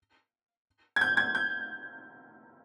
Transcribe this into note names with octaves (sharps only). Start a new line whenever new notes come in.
G#6
G6
G#6
G6